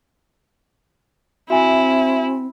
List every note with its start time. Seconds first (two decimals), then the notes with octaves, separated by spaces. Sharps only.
1.50 C4 E4 F#4 E5 G#5